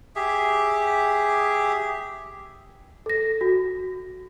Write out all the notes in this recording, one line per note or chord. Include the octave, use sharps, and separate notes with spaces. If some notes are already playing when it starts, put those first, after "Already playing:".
G4 G#4 E5
A4 A#6
F#4